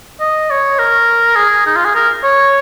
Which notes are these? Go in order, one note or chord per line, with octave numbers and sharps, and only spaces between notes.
D#5
C#5
A#4
G#4
D#4
F4
G#4
A#4
C#5